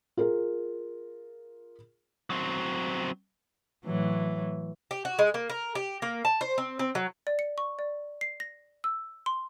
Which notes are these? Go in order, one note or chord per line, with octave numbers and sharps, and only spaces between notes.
F4 G#4 A#4
F#3 C4
A2 E3 F#3
G4
F#4
G#3
A#3
A#4
G4
A#3
A5
C5
C4
C4
F#3
D5
C#7
C#6
D5
C7
A#6
E6
C6